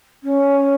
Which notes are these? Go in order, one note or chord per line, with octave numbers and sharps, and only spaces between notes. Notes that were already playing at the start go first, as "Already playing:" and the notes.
C#4